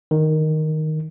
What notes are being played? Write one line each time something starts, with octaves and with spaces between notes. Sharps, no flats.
D#3